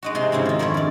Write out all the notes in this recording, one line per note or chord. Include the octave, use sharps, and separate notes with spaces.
G#3 D#4 F#4
C3 C6
G#2 C#3 C4 D#4 E4
D#3 F4
F2 D#3 A3 C#4 E4
G2 D5